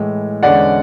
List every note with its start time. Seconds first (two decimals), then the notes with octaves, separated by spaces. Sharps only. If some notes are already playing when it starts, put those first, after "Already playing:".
Already playing: A2 E3 G#3
0.43 E2 D3 G#3 C#4 D5 F#5